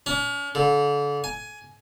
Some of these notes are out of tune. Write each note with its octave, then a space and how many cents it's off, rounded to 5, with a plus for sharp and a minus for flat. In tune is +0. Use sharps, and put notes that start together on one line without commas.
C#4 +40
D3 -35
G#5 +15